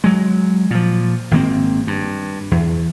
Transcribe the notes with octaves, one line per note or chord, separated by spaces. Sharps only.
F#3 G#3
A#2 F3
G#1 D#3 A#3 C4
G2
E2